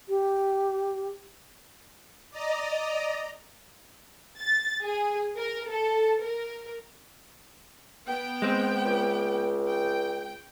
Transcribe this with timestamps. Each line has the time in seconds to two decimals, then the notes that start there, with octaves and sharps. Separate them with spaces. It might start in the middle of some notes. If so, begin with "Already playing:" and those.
0.09 G4
2.31 D5 D#5 A#5
4.40 A6
4.84 G#4
5.37 A#4
5.69 A4
6.22 A#4
8.05 B3 G5
8.42 G#3 C4
8.85 C#2
9.68 G5